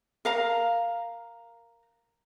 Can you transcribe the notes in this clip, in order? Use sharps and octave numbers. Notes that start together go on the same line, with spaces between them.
A#4 F5 A#5